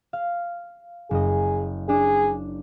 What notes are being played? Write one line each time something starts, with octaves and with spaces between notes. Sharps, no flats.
F5
F#1 G#4 D#5
D4 G#4